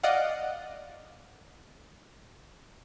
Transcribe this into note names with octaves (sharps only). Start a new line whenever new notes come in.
D5 D#5 F5 F#5